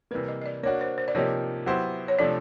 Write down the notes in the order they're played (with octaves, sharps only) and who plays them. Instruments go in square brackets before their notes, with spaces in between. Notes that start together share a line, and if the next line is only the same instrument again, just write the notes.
[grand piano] C3 E3 G3 A#3 [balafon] B4
[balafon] D#5
D#5
D5
[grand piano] A#3 D4 F#4 [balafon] C#5
[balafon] C5
C5
D5
[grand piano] C3 F3 A#3 D#4 G4 [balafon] C#5
[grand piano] F#3 B3 E4 G4 C5
[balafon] C#5
[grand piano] C3 F3 A3 D4 [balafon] D5